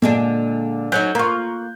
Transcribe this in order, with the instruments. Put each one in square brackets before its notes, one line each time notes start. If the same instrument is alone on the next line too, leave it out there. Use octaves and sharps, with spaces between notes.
[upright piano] A#2 [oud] D3 G#3 D4
[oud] F#3 C#4 D#4 [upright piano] C#5 F#6 G6
[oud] A#3 F4 [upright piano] A#5 C#6